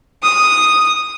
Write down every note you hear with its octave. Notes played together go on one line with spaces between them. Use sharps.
D#6